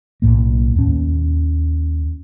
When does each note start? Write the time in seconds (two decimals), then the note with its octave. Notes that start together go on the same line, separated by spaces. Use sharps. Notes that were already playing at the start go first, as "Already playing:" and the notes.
0.22 B1 F#2 A2 A#3
0.76 D#2 C#4